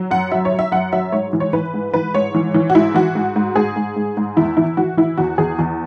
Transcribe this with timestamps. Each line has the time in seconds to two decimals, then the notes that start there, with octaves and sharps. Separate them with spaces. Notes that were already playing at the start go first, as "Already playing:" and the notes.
Already playing: F#3
0.11 F#2 F#5
0.32 F#3 E5
0.45 C#5
0.52 F#3
0.59 E5
0.72 F#2 F#5
0.93 F#3 E5
1.12 G#2 C#5
1.33 E3
1.40 C#5
1.53 E3 B4
1.74 G#2
1.94 E3 B4
2.14 G#2 C#5
2.34 E3
2.54 E3
2.70 F#4
2.75 G#2 E4
2.95 E3 F#4
3.15 G#2
3.36 G#2
3.55 G#2 G#4
3.76 G#2
3.96 G#2
4.17 G#2
4.37 E2 E4
4.57 E3 E4
4.77 E3 F#4
4.97 E3 E4
5.18 E2 F#4
5.38 E2 G#4
5.59 E2